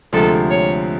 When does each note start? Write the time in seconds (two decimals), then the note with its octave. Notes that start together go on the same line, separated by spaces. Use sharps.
0.12 D2 C3 F3 G#3 A4
0.50 C#5